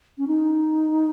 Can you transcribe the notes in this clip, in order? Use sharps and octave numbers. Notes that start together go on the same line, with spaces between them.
C#4
D#4